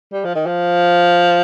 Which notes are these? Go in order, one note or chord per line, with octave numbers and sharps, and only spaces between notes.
G3
F3
D#3
F3